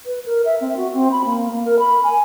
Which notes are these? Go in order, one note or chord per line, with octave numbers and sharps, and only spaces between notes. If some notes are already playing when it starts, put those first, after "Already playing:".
B4
A#4
E5
C4
F#4
C4
B5
A#3
A#3
A#4
B5
G#5